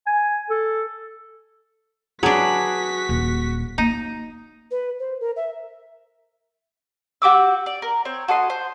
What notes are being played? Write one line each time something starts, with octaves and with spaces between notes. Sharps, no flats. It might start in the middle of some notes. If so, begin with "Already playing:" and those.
G#5
A4
F#3 D4 F#4 G#4 B4 B6
D#1
A#3 D#4
B4
C5
A#4
E5
F#4 G4 D6 E6
D5
A#4
C4 C#5
F#4 A4 D#5 C6
C5